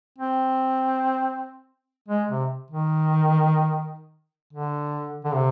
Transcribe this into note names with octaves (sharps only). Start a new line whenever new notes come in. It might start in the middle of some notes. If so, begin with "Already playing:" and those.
C4
G#3
C3
D#3
D3
D3
C3